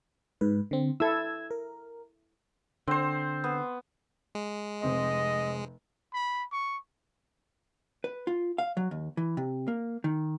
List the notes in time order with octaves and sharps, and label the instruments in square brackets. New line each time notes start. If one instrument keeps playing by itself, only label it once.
[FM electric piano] G#2 B4
D3 C4
[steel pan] E4 A4 [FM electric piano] E6 G#6
[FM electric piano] A#4
[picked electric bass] D3 [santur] C4 C5
[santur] B3
[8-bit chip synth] G#3
[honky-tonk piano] F1 C4 C6 [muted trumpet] D#5
[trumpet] B5
C#6
[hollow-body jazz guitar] B4
F4
F5
F#3
D#2
E3
C3
A#3
D#3